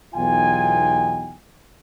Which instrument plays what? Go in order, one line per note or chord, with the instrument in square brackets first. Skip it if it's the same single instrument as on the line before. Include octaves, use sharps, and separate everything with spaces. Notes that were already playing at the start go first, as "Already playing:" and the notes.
[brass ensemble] B1 E2 D#4 F4 G5 G#5